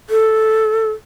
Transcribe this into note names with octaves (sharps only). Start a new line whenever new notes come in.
A4